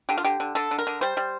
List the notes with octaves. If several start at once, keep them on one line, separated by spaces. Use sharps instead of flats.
D3 G4
F4
D3 G4
D3
D3 A4
D3
A#4
D3
G3 C5
G3